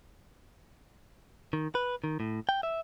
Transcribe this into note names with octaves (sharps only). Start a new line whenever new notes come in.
D#3
B4
D#3
A2
G5
E5